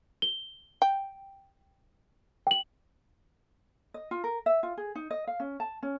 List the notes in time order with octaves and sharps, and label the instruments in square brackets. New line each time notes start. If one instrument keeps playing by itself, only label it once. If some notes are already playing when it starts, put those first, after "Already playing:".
[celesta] G7
[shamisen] G5
[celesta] G5 F#7
[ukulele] D#5
F4
A#4
E5
F4
G#4
D#4
D#5
F5
C#4
A5
C#4